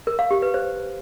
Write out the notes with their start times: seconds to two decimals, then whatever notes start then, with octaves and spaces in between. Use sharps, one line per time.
0.07 A#4
0.19 F5
0.31 G4
0.42 B4
0.54 C5